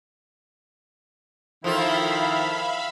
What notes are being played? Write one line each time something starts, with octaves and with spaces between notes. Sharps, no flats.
D#3 F3 E4 F4 A4 E5 F5 B5